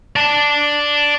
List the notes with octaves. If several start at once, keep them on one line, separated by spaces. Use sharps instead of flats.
D5 A5